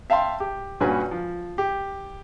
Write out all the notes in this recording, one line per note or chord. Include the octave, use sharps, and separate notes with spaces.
E5 F5 G5 A5 C6
G4
G2 A#2 C#4 F#4 B4 G#5
F3
G4